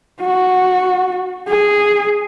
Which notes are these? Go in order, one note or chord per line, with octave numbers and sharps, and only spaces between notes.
F#4
G#4